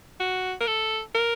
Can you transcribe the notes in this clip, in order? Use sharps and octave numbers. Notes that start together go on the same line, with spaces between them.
F#4
A#4
A4
A#4